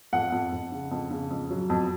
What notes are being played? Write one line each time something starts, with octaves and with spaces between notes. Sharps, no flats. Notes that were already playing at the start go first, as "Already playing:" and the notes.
F2 F#5
F2
F2
C#3
F2
C#3
F2
F#3
F2